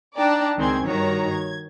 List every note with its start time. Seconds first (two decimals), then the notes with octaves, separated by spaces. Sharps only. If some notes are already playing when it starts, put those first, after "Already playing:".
0.17 D4 D#4 D5 G5 A5 A#5
0.57 C#2 D#3 C4 G#4 C6 G#6
0.86 G2 D#3 F#4 C#5 A#5
1.30 G#6